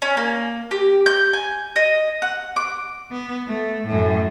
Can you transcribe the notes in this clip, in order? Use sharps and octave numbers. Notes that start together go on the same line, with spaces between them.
C#4
A#3
G4
G6
G#5
D#5
F#5
D6
B3
A3
F#2 A2